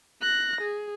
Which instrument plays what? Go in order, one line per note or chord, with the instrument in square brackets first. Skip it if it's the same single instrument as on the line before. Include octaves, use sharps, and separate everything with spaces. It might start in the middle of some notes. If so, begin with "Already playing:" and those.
[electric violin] F#6 A#6
G#4